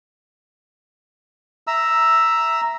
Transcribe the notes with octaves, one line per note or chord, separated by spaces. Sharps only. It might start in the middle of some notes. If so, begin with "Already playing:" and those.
E5 A#5 E6